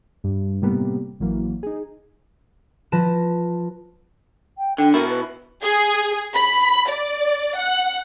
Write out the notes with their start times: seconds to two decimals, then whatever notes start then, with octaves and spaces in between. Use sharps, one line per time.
0.24 G2
0.62 A2 C3 G3 A#3 B3
1.20 A1 E3 F#3 A#3
1.63 D#4 G#4
2.92 F3 B4 A5 A#6 E7
4.58 G5
4.78 D3 G5
4.94 B2 E4 A#4
5.10 B4
5.64 G#4
6.35 B5
6.89 D5
7.57 F#5